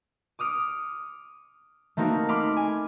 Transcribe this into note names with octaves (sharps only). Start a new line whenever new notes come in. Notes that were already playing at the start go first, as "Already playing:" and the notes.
D6 D#6 F6 C#7 D7
A3 A#3 C4 D#4 F#4 A#4
B5 C6 D6 F6
G#5